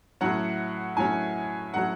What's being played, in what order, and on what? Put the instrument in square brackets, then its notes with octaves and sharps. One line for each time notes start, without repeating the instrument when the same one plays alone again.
[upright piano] A2 F#3 C#4 [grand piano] F#5
[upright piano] A2 F#3 C#4 [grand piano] G#5
[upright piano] A2 F#3 C#4 [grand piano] F#5